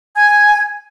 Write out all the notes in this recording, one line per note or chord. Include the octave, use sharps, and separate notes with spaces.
G#5 G#6